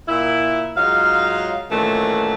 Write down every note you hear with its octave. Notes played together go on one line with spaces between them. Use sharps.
A#2 E4
G#2 F#3 D#4 F4 F5
F#2 A#2 D#3 E3 F#3 A3